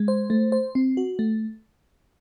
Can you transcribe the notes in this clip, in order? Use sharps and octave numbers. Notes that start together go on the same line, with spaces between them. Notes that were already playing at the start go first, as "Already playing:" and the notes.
Already playing: G#3
C5
A3
C5
C4
F#4
A3